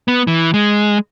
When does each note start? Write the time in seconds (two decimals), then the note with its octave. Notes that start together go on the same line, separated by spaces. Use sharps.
0.08 B3
0.27 E3
0.54 G#3